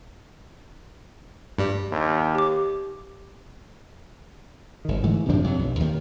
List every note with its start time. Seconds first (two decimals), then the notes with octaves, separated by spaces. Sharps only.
1.58 G2 G3
1.91 D#2
2.35 G4 D6
4.85 G1 D#3
5.03 G#2 E3 A3
5.29 F#2 C3 F3 D4
5.44 F2 C3 F#3
5.59 B1
5.80 D#2 D#3 A#3